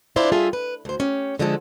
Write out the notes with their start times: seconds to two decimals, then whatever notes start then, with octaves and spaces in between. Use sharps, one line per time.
0.16 D4 E4 F4 C5 D5 F5
0.32 G3 F4 G#4 A4 E5
0.53 B4
0.85 D2 C5
1.00 C#4 G4
1.39 D3 F3 G#3 E4 A4